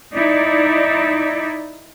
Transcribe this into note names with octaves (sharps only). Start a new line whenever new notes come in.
D#4 E4 D5